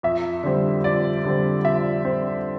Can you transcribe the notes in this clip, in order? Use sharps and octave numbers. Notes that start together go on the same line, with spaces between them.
F2 E5
D3 G3 C4
F2 D5
D3 G3 C4
F2 E5
C4